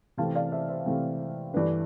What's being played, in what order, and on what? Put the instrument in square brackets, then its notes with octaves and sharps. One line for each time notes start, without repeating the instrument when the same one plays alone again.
[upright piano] C3 E3 A3 C4 F5 A5
D5 F5
C5 E5
C5 E5
C3 E3 A3 C4
G2 E3 A3 D4 B4 D5